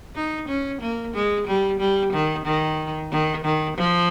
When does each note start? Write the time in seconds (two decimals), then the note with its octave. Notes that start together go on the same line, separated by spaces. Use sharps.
0.15 D#4
0.48 C#4
0.81 A#3
1.14 G#3
1.47 G3
1.80 G3
2.13 D#3
2.45 D#3
3.11 D#3
3.44 D#3
3.77 F3